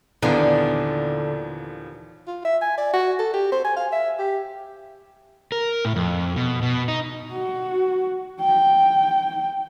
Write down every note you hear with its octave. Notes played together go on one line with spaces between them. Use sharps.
D#2 A#2 D3 E3 F3 B3 D4
F4
E5
G#5
D5
F#4
A4
G4
C5
G#5
F5
E5
G4
A#4
A2
F2
B2
B2
D#4
F#4
G5